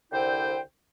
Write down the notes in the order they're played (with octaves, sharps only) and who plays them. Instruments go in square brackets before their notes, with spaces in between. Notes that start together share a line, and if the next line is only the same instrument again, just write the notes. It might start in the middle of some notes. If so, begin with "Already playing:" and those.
[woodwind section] C2 D3 E4 C5 G5